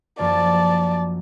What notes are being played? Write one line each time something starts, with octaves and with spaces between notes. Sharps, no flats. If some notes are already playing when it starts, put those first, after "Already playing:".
F#2 F3 A#3 D5 A5